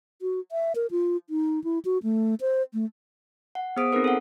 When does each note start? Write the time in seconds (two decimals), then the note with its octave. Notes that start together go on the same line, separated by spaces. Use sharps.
0.22 F#4
0.52 E5
0.75 A#4
0.91 F4
1.30 D#4
1.64 E4
1.85 F#4
2.03 A3
2.41 C5
2.73 A3
3.55 F#5
3.77 B3 G#4 C5 D#6 B6 D7
3.92 C4 D#4 G#4 A#4 B4
4.04 A4 F#5